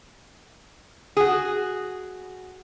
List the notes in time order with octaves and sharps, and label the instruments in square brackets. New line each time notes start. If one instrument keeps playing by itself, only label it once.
[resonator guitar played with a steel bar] F#4 G#4